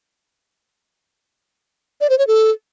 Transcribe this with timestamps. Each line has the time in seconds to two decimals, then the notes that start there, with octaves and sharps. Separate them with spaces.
2.01 D5
2.10 C5
2.18 C#5
2.27 A4